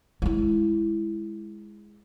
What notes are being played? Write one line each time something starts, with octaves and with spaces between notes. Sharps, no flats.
G#3 E4